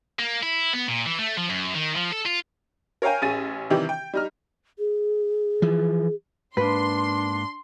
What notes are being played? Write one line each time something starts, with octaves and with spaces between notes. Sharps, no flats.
A#3
E4
B3
A#2
E3
A3
F3
F#2
D#3
F3
A4
F4
A#4 C#5 F5 G5 G#5
A1 C#4 G#4 A6 D#7
C3 D#3 E3 G3 G4
G5
G3 D#4 F6
G#4
E3 F3
G#2 A#3 D4 B4 C6